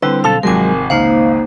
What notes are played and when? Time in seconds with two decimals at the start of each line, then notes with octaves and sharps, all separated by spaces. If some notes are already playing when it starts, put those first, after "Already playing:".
0.02 D3 G3 C4 E4 B4 E6
0.24 B1 A4 F5 A5
0.43 G#1 C3 F3 F#3 G#3 A#4 G#5
0.90 G#1 C#2 A#3 D#4 C5 F5